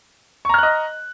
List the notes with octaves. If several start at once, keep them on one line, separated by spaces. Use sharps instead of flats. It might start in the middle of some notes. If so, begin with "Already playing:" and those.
D#5 A#5 C#6 F6 F#6